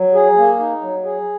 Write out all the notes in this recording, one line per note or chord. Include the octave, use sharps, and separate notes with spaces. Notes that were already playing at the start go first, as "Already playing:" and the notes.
Already playing: F#3
G#4
A#3
D#4
F#3
G#4